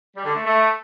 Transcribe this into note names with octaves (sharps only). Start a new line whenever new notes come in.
G3
D3
A3
A3